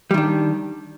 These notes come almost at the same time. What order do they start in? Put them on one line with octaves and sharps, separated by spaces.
G3 D#3 D4